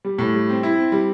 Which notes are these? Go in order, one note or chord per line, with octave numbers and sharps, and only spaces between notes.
G3
A2
G3
C4
E4
C4
G3